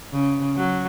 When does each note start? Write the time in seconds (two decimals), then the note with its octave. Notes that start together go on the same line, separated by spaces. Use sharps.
0.12 C#3
0.57 F#3